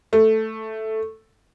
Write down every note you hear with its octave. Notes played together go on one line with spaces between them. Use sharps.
A3